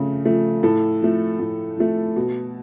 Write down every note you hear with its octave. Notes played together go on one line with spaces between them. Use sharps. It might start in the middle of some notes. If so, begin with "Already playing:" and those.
Already playing: C#3 F3 A3
F3 A3
A2 A4
F3 A3
A2
F3 A3
B2